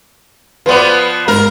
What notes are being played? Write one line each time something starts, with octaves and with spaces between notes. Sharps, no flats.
F3 B3 B4 C5 D5
G#2 A#4